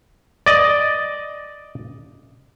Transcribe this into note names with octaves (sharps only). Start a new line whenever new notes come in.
D5 D#5